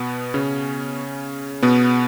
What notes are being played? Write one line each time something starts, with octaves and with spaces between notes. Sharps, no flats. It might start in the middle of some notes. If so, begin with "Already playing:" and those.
Already playing: B2 B3
C#3 C#4
B2 B3